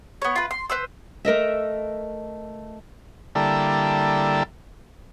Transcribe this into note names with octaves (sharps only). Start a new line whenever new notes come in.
B3 C#5
F4 B4
C6
B4 C5 E6
A3 A#4 D#5 E5
D3 G3 A#3 E4 A4